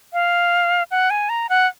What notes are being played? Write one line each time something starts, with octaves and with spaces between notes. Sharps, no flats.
F5
F#5
G#5
A#5
F#5